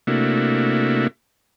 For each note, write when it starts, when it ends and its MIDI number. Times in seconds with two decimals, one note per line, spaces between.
0.07 1.07 48
0.07 1.07 57
0.07 1.07 58
0.07 1.07 62
0.07 1.07 64
0.07 1.07 66